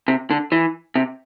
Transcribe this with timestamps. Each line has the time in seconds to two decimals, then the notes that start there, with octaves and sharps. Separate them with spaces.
0.08 C3
0.30 D3
0.52 E3
0.95 C3